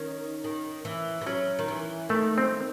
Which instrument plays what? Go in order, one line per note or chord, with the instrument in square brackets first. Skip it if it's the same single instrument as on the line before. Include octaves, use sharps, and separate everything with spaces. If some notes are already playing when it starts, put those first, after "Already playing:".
Already playing: [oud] D#3 [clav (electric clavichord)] C#4
[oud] D#3
E3
E3
[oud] F#3 [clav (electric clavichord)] C#4
[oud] D#3
E3
[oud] D#3 [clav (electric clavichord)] A3
[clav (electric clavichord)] C4